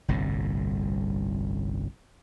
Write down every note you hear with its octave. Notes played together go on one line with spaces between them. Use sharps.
G1 C2 A2